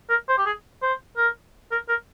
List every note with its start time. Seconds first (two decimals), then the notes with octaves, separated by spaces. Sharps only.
0.09 A#4
0.28 C5
0.37 G4
0.46 G#4
0.82 C5
1.17 A#4
1.71 A#4
1.89 A#4